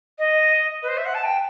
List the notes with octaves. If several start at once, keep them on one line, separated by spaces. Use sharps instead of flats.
D#5
B4
C5
E5
F#5
A5
G5